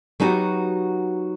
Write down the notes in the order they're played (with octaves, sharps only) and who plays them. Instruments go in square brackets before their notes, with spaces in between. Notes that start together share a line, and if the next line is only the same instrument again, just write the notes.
[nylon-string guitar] F#3 B3 D#4 F#4 G4